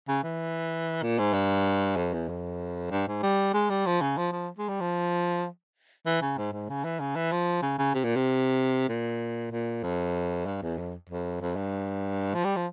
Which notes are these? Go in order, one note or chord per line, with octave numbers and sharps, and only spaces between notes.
C#3
E3
A#2
G#2
G2
F2
E2
F2
G2
G#2
G3
G#3
G3
F3
C#3
F3
F3
G#3
G3
F3
E3
C#3
G#2
G#2
C#3
E3
C#3
E3
F3
C#3
C#3
C3
A#2
C3
A#2
A#2
F2
G2
E2
F2
F2
F2
G2
F3
G3
F3